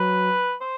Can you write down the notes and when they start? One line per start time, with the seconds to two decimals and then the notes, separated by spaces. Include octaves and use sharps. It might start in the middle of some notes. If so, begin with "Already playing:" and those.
Already playing: F#3 B4
0.61 C5